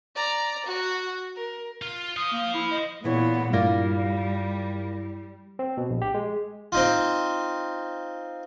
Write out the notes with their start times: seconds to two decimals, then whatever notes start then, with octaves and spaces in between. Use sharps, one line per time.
0.16 D5 A#5
0.66 F#4
1.36 A#4
1.82 F4
2.17 C5 F5 D#6
2.32 A#3
2.54 E4
2.71 D#5
3.04 E2 A#2 E3 B3 C#5
3.53 G2 G3 A#3 E4 F4 D5 A#6
5.59 C4
5.77 B2
5.90 A#1
6.02 G4
6.14 G#3
6.72 C4 D#4 F4